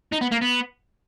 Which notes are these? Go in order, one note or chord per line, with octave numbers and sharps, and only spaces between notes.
D#4
B3
A#3
B3